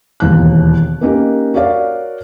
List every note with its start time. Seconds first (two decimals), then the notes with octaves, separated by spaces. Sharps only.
0.20 E1 D#2 F#6
1.01 A#3 C#4 D#4 G4 A#4
1.54 F#4 A#4 C#5 D5 F5